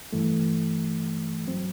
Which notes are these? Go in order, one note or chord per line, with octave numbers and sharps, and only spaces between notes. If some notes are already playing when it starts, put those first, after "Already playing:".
G2 E3 A3
G2 F#3 C4